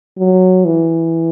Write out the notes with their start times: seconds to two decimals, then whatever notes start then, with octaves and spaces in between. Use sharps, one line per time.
0.18 F#3
0.65 E3